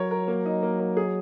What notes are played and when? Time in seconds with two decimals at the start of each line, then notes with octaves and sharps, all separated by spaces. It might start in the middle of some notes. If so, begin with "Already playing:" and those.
Already playing: F#3 A#4 C#5
0.11 A#4
0.28 A#3
0.46 D#4
0.63 A#3
0.80 A#3
0.97 G#4